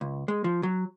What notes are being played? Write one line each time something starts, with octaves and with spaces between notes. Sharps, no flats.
C#2
G#3
F3
F#3